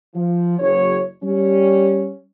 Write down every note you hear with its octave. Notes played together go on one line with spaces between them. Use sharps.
F3
F#1 C#5
G3 C#4